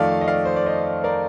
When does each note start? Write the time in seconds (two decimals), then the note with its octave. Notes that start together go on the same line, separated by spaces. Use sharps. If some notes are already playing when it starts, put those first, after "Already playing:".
Already playing: F2 D#3 A3 D5 F5
0.21 D#5
0.28 D5 F5
0.45 C5
0.56 D5
0.66 C5 D#5
1.04 A#4 D5